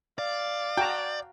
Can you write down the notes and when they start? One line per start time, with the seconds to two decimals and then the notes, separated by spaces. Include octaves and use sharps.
0.18 D5 F5
0.77 F#4 G5 A5 A#5